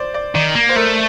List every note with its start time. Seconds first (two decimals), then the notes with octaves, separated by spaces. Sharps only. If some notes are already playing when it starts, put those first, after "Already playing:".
Already playing: C5 D5
0.14 D5
0.35 D#3 D5
0.55 A#3
0.69 C5
0.76 A3 A#4